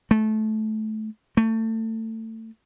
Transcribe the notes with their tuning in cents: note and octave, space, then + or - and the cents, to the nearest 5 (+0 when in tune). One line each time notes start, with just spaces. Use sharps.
A3 -20
A3 +25